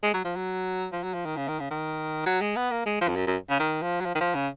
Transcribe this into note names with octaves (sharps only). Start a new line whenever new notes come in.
G#3
F#3
F3
F#3
F3
F#3
F3
D#3
C#3
D#3
C#3
D#3
F#3
G#3
B3
A#3
G#3
F3
F2
F#2
F#2
C#3
D#3
F3
F#3
F3
D#3
F3
C#3